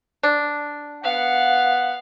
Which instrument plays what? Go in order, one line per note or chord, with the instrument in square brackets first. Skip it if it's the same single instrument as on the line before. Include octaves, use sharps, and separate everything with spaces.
[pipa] D4
[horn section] B3 F#5 [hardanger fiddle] F5